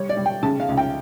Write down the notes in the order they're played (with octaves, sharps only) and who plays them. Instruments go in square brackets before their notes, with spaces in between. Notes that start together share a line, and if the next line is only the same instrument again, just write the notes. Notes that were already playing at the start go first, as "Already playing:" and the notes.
Already playing: [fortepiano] G3 C#5
D5
G3
G5
C#3 A5
F5
C#2
G5